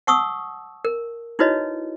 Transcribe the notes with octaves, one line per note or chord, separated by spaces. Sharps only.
F#5 A5 C#6 D#6 E6
A#4
D#4 E4 F#4 B4 C#5 D#5